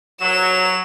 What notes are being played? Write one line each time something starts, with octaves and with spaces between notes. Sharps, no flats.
F#3 E7